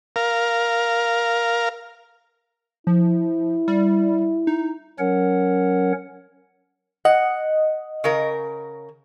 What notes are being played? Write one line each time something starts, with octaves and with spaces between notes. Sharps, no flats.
A#4 F5
F3 E4
G3
D#4
F#3 C#4 A#4 C#5 F#5
D#5 F#5
C#3 A#4